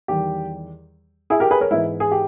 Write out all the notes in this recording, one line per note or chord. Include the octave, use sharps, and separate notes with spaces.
E2 D#3 G3 G4
E4 G#4
G4 A#4
G#4 B4
A#4 C#5
G#2 E3 G#3 B3 E4
G#4
G4